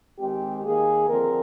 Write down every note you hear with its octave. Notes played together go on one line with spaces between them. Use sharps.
D#3 G#3 C4 G4
D#3 A#3 G#4
D3 F3 C4 A#4